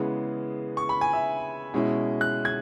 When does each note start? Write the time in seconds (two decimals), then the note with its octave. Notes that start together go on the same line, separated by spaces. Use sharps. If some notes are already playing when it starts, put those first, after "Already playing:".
Already playing: C#3 E3 G#3 B3
0.77 C#6
0.89 B5
1.01 G#5
1.13 E5
1.74 B2 G#3 C#4 E4
2.21 F#6
2.45 G#6